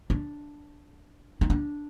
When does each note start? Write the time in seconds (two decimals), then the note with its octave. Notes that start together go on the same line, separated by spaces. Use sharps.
0.10 D4
1.41 D#4
1.50 D4